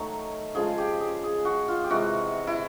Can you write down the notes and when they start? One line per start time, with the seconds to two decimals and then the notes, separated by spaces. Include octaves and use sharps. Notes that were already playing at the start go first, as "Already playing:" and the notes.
Already playing: D#3 F#3 A3
0.55 C#3 F3 G#3 G#4
0.78 G4
1.01 G#4
1.23 G#4
1.45 F#4
1.68 F4
1.84 G4
1.90 C3 E3 G#3 F#4
2.47 E4